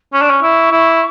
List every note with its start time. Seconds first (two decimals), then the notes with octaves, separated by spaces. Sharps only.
0.13 C#4 C#6
0.22 D4
0.30 C#4
0.42 E4
0.71 E4